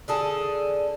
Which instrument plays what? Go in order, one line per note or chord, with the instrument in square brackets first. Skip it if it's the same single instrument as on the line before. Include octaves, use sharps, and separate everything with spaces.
[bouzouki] D3 G#4 A4